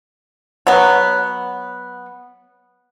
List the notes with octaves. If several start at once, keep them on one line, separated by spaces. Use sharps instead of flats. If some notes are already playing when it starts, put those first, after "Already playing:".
F#3 B3